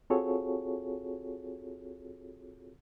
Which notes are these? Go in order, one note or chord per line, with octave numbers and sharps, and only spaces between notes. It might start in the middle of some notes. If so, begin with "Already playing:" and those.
C4 F4 F#4 G#4 A4 C#5